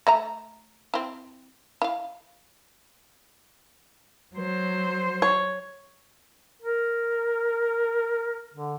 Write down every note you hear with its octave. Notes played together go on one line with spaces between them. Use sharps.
A3 E5 A#5
C4 E4
E4 F5
F#3 C5
C#5
A#4
D3